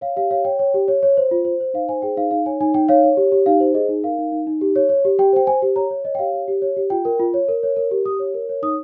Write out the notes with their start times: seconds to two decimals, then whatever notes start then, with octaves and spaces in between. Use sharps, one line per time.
0.01 C#5 F5
0.16 G4 F5
0.31 C#5 F5
0.45 C#5 G5
0.59 C#5
0.74 G4
0.88 C#5
1.03 C#5
1.17 C5
1.31 F4
1.45 C5
1.60 C5
1.74 D#4 F5
1.89 C5 G#5
2.02 G#4 G5
2.17 D#4 F5
2.31 D#4 F5
2.46 C#5 G#5
2.61 D#4 G#5
2.74 D#4 G5
2.89 C#5 F5
3.04 C#5
3.17 G4
3.32 G4
3.46 D#4 F5
3.60 C5
3.74 G#4 D#5
3.89 D#4
4.04 A#4 F5
4.19 D#4
4.32 D#4
4.47 D#4
4.61 G4
4.76 C#5
4.89 C#5
5.05 G4
5.19 G4 G5
5.33 C5 G5
5.47 C5 G#5
5.62 G4
5.76 C#5 A#5
5.91 C#5
6.04 C#5 D#5
6.15 G5
6.19 G4 F5
6.33 C#5
6.48 G4
6.62 C#5
6.77 G4
6.90 F4 G5
7.05 A#4
7.20 F4
7.34 C#5
7.48 A#4
7.63 C#5
7.76 A#4
7.91 G4
8.05 G4 D#6
8.19 C#5
8.34 A#4
8.49 C#5
8.62 D#4 D#6